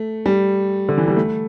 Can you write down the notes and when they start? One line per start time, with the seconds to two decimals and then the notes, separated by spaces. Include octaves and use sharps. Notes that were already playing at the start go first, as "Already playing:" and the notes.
Already playing: A3
0.26 G3
0.89 D3
0.98 E3
1.08 G3
1.16 A3